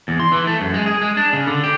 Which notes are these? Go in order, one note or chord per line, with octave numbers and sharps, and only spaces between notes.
E2
C6
E3
A3
F#2
G#3
G#4
G#3
D4
C#3
D3
G4